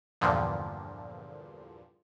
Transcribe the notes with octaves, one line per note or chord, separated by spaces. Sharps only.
E2 G2 A#2 D3 F3